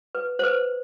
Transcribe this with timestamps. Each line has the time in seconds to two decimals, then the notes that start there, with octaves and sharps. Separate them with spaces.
0.15 B4
0.39 C5
0.44 B4